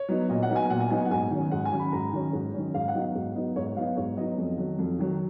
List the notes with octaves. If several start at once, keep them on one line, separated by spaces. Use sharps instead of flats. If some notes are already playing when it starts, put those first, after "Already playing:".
Already playing: C#5
F#3 B3 D#4
A#2 D#5
F#5
F#3 B3 D#4
G#5
A#2 F#5
G#5
F#3 B3 D#4 G#5
F#5
G#2 G#5
D#3 F#3 C#4
G#2 F#5
G#5
D#3 F#3 C#4
B5
G#2 A#5
D#3 F#3 C#4
G#2
D#3 F#3 C#4
G#2 F5
F#5
F#3 B3 D#4
F5
G#2
F#3 B3 D#4
G#2 C#5
C#5
F#3 B3 D#4 F5
G#2 C#5
F#3 B3 D#4 D#5
F2
D#3 F#3
F2
D#3 F#3